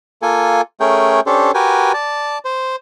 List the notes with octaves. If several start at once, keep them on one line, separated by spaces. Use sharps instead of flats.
A#3 F4 A4 G#5
A3 C#4 G#4 A#4 G5
C#4 D4 G4 A4 C5
F#4 G4 A#4 B4 G5 G#5
D5 A5
C5